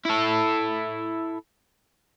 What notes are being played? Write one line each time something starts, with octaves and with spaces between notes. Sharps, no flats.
E4 A4